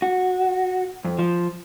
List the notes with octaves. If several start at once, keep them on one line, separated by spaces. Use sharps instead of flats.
F#4
F2
F3